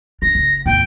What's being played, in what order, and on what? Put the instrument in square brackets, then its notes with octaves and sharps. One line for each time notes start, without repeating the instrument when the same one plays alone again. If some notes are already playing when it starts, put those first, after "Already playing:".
[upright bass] D4 [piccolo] A#6
[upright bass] F#1
[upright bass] E2 A2 [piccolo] G5